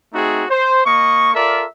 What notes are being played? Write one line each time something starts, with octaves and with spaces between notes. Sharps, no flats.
A3 C4 D#4 F#4 G#4
C5
A#3 D#5 C#6
F4 A4 A#4 D5 E5